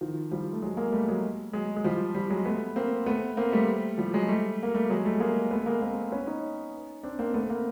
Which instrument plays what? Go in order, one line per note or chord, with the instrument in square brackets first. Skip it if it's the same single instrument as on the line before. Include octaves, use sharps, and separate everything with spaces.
[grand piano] D#3 F3
F3 G3
A3
F#3 G#3
G#3 A#3
G3 A3
F#3 G#3
F#3 G#3
G#3
F3 G3
F3 G3
F#3 G#3
A3 B3
A#3 C4
A3 B3
A#3 C4
G3 A3
F3 G3
F#3 G#3
G3 A3
A#3
G3 A3
F#3 G#3
G3 A3
G#3 A#3
A3 B3
G#3 A#3
A#3 C4
B3 C#4
C#4 D#4
C4 D4
A#3 C4
A3 B3
A#3 C4